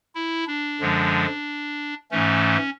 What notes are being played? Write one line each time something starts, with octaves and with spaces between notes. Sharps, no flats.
E4
D4
F#2 D3 F3 G#3
G#2 E3 A3 C#4